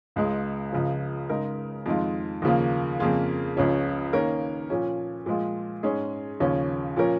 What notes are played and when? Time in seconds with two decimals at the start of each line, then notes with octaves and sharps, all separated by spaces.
0.16 C#2 C#3 G#3
0.72 C#2 C#3 F3
1.29 C#3 G#3 D#4 A#4
1.86 F2 D#3 G#3 F4
2.42 D#2 C#3 F3 A#3
3.00 F2 C#3 A#3 F4 G#4
3.56 C#2 C#3 F3 C#4
4.13 D#3 A#3 C#4 A#4
4.70 A#2 F3 C#4
5.26 A#2 F3 G#3 F4
5.83 G#2 G#3 C#4 G#4
6.40 D#2 C#3 F3 C#4
6.97 A#2 F3 C#4 A#4